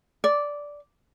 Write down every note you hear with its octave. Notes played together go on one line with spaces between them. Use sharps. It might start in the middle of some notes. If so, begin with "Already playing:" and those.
D5